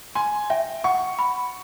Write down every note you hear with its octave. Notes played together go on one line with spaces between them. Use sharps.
G#5 C6
E5 G5
F#5 C#6
B5